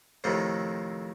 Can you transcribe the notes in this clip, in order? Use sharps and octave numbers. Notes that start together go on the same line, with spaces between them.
F2 A2 C3 D#3